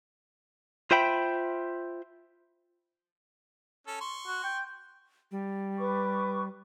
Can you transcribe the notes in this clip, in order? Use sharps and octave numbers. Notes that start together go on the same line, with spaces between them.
F4 C5 E5 G5 B5
C#4 A4
C6 C#6
F#4
G5
G3
B4 C#6 D6